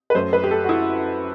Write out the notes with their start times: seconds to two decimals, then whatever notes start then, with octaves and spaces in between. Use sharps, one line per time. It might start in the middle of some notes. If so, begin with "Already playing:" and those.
0.10 B4
0.14 F#2 F#3 A3 C5
0.33 B4
0.44 G4
0.51 A4
0.64 F#4
0.69 E4